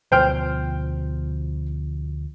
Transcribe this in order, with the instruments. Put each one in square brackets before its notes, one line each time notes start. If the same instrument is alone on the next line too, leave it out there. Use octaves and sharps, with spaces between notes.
[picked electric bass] D2 B2 F3 [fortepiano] C5 G5 F6